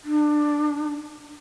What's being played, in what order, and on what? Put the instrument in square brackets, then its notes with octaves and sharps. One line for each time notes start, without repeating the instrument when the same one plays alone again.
[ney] D4